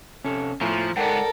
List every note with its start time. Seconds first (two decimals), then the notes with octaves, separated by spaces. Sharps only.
0.24 C3 C#4 A4
0.61 A2 F3 F4 G#5 A#5
0.97 G#2 B3 A4 A#4 D5 F#5 G5